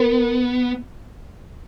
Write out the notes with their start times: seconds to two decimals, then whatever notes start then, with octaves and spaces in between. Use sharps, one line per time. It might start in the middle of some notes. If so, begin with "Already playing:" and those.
Already playing: B3 A#4